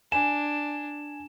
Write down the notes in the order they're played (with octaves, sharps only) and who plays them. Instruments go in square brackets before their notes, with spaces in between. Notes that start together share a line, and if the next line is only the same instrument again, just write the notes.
[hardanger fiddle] D4 [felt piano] G#5 [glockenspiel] E7